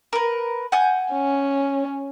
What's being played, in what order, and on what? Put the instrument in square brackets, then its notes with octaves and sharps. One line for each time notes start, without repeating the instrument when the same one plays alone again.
[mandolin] A#4 B4
F#5 G#5 G6
[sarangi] C#4